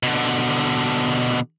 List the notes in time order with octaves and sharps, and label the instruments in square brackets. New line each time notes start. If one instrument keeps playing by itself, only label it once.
[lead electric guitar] B2 D3